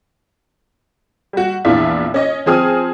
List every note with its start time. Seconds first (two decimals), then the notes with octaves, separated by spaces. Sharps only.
1.33 G3 F#4
1.65 A#1 E2 E3 D4 F4 E5
2.14 C#4 D#5
2.46 F3 C4 G#4 D#6 F6